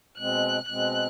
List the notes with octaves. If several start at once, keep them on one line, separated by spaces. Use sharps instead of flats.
B2 G#3 C4 F#6
B2 G#3 C4 F#6